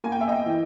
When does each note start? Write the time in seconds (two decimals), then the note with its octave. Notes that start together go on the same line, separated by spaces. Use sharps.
0.04 A#3 G#5
0.12 G5
0.21 E5
0.28 D#5 G5
0.46 E3